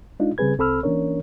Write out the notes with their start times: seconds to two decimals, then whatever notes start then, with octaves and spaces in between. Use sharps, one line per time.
0.20 G#3 D4 D#4 F4
0.38 C#3 G3 C4 G#4 B4 G#6
0.58 C2 C4 A4 B5 E6 F6
0.83 E3 A#3 C#4 D4 A#4 C#5